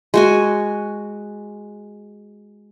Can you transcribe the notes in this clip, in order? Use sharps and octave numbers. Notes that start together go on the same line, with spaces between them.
G#3 F#4 G#5